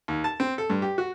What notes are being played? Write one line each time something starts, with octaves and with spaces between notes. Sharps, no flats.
D#2
A5
C4
A4
G2
G4
F#4